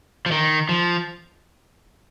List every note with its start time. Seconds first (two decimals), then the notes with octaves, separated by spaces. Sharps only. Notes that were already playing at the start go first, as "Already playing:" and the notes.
0.26 F3
0.31 D#3
0.69 F3